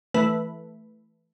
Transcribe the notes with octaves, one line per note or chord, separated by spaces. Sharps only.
E3 A3 B4